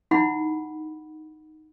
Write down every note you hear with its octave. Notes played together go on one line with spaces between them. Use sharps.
D#4 E4 F#5 B5